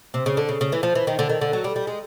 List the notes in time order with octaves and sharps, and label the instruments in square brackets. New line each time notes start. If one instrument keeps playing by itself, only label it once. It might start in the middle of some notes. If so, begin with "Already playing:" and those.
[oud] C3
C#3
D3
C#3
C#3
E3
F3
E3
D#3
D3
D#3
D3
F#3
G3
G3
G#3